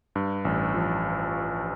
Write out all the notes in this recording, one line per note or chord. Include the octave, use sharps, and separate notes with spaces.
G2
A1
F3